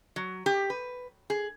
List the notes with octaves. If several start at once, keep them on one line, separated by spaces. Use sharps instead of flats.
F#3
G4
B4
G#4